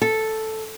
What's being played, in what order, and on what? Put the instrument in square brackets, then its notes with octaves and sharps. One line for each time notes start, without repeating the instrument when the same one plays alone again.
[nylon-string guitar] A4